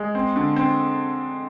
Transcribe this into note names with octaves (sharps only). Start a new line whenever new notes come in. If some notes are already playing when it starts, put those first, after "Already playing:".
Already playing: G#3
C4
D3
C4